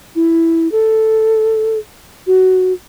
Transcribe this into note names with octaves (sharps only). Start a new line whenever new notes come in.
E4
A4
F#4